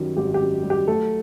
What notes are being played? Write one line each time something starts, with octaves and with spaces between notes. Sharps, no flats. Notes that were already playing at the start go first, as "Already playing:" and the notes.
Already playing: F#2 D#3 G3
G#1 G4
G4
F#2
G3
G4
F#3 A3 A4